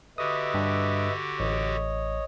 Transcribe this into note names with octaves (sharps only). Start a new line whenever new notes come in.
D3 F#4 G4 B4 D#5 E5 D#6
G2
A1 C#5 D#5